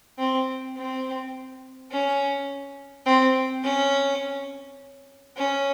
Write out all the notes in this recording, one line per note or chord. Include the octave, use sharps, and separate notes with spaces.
C4
C4
C#4
C4
C#4
C#4